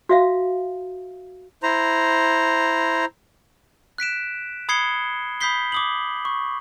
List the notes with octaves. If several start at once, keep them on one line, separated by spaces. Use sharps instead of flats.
F#4 E5 F5
E4 C5 A#5
F#6 B6 D7 E7
B5 D#6 G#6 C7 C#7 G7
B5 D#6 G6 B6 C7 G7
D6 D#6 F#7
C#6